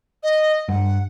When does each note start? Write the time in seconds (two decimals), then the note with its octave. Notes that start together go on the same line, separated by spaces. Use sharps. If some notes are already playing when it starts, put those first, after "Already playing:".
0.23 D#5
0.69 G2 F#5